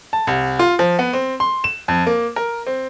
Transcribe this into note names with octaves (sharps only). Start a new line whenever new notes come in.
A5
C2
F4
F3
B3
C4
C6
E7
F2
A#3
A#4
C4